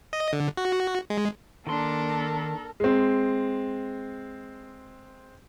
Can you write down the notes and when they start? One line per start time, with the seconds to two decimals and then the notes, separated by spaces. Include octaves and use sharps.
0.13 D#5
0.33 D3
0.57 F#4
1.10 G#3
1.67 D#3 A#3 D4 A4 A#4 C6
2.80 G#3 C4